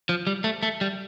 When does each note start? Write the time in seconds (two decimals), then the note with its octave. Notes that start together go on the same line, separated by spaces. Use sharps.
0.09 F3
0.27 G3
0.44 A3
0.63 A3
0.81 G3